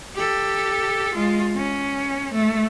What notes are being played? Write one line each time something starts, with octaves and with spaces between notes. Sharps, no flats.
G4 A4
G#3 F4
C#4
A3